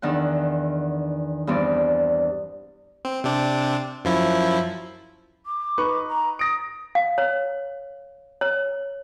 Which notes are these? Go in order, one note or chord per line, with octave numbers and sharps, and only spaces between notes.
E2 D#3 D4 F#5
E2 G2 C4 D5
C4
C3 C4 D4
F#2 F3 E4
D6
D#4 B4 C#6
A#5
D#6 A#6 D7
F5
C#5
C#5